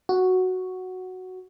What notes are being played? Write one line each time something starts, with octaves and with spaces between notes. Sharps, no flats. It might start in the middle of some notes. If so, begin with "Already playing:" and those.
F#4